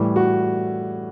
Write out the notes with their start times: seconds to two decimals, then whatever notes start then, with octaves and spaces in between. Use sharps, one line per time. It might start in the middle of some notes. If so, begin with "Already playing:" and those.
Already playing: A2 E3 G3
0.16 F#4